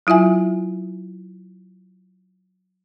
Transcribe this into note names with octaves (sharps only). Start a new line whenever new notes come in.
F#3 E4 F4 E5 G#5